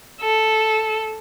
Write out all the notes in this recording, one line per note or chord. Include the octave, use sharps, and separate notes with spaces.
A4